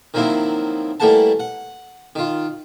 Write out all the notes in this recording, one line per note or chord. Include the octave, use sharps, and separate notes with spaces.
D#3 F3 F#3 A#3 C4 E4
E3 G3 A3 A#3 F#5 A5
F#5
D#3 F4